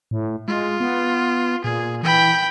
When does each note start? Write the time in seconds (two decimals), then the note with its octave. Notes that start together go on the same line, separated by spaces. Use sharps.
0.11 A2
0.48 G#3 F4
0.80 B3
1.64 A#2 G#4
2.03 E3 G5 B5